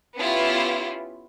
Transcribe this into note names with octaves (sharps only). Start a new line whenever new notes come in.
B3 C#4 E4 F4 G4